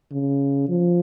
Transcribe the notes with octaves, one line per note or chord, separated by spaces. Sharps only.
C#3
F3